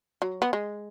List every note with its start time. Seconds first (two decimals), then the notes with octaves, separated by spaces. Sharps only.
0.22 F#3
0.42 B3
0.53 G#3